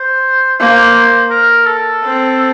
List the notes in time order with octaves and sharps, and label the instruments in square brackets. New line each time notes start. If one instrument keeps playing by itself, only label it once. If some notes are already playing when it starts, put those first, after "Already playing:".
Already playing: [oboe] C5
[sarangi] A#3 [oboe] C5
[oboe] A#4
A4
[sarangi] C4